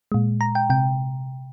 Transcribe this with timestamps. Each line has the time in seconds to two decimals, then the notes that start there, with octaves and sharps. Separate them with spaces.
0.12 A#2 G#3
0.41 A#5
0.55 G5
0.70 C3 G5